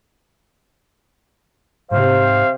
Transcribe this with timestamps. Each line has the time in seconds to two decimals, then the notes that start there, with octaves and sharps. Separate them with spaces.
1.91 G#2 C3 C5 F5